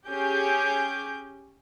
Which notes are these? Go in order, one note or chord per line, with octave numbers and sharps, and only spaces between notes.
C#4 G4 G#4 D6 G6